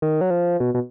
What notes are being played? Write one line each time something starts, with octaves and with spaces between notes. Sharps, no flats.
D#3
F#3
F3
B2
B2